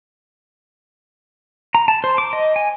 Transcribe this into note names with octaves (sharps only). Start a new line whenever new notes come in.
A#5
A5
C5
D6
D#5
G#5